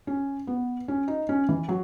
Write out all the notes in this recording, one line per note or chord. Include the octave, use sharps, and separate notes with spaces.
C#4
B3
C#4
D#4
C#4
E3
F#3